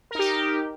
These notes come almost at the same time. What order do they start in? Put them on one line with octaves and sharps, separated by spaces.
A#4 D#4 G4